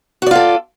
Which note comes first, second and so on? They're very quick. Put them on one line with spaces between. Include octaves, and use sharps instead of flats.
F#4 D5 F4 A4